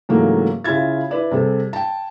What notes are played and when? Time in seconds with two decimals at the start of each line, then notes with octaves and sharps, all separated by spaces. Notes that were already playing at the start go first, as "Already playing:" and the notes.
0.09 G#2 C#3 E3 F#3 A3 A#3
0.64 C#3 E4 F4 G#6 A6
1.11 E4 B4 D5
1.31 C3 G3 G#4 A4
1.73 G5 A5